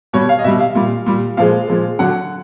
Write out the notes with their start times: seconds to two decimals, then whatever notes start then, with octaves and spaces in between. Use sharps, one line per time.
0.13 B2 G3 C#5
0.29 F5
0.39 D#5
0.44 B2 G3 E5
0.60 F5
0.75 A#2 G3
1.06 A#2 G3
1.37 A#2 F3 G#3 F5
1.68 A#2 F3 G#3
1.99 D3 F#3 F#5